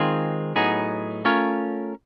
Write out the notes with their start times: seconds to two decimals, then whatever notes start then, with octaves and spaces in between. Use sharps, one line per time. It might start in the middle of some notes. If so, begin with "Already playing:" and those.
Already playing: D#3 G#3 C4 F4 G#4
0.56 A2 F#3 B3 D#4 G#4
1.25 A3 C#4 F4 A#4 C#5